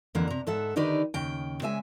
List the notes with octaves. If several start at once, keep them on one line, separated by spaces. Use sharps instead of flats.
F2 D3 E3 A#3 F#5
C3 A#5
G#2 A4 E5 F#5
D3 D#3 D#4 G4 B4 D5
D#2 C#3 G5
C#3 G#3 E5 G#5